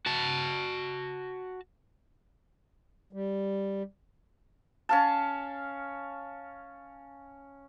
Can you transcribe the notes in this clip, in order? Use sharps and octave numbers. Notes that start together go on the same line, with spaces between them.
F#4 A5
G3
C#4 F5 A5